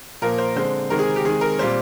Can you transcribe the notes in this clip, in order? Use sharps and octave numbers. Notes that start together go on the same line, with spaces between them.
A#2 F3 A#3 A#4
C5
D3 G#3 C4 C5
C3 D#3 G#3 C4 A#4
G#4
G4
D#3 G#3 C4 G#4
A#4
A#2 G3 C4 C5